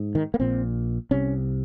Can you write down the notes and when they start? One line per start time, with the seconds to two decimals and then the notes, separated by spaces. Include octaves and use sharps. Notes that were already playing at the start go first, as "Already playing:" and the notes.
Already playing: G#2
0.15 D#3
0.34 A#3
0.40 A#1 A#2 C4
1.11 C2 C3 C#4